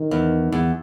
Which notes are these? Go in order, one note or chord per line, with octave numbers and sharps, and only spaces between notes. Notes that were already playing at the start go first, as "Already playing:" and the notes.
Already playing: D#3
E2
E2